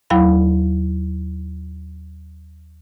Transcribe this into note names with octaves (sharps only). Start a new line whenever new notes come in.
D#2 F#3 E4 F5 B5